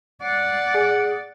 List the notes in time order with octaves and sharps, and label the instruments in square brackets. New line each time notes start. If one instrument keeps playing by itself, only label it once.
[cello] D5 [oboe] F#5 [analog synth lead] C7
[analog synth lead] G#4